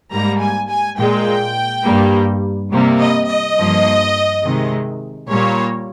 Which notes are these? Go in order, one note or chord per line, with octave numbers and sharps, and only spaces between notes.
G#2 G3 A#3 A#5
G#5
G#5
A#2 G#3 G5
G2 G3 A#3
C3 G3 A#3
D#5
D#5
G2 F3 A#3
C3 D#3 G#3
A#2 G3 A#3 C#5